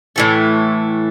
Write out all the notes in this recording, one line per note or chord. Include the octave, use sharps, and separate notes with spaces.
A2 E3 A3